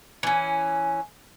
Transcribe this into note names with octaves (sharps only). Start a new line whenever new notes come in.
E3 C#4